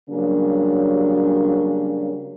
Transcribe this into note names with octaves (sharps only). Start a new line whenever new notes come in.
C#3 F#3 G3 A#3 C#4 D4